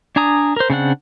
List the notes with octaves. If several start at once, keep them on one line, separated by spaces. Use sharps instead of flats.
D4 G#5 A#5 D#6
A#4 C5
C#3 C4 D4 F#5